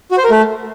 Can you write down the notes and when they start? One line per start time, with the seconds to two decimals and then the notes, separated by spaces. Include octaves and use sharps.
0.11 F#4
0.18 C5
0.24 A#4
0.31 A3